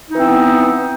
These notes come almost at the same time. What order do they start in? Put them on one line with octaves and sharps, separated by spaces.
D#4 E3 C4 B3